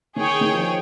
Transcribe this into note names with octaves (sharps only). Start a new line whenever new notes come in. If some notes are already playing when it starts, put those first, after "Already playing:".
D#3 G#4 C#5 G5
D#3
F3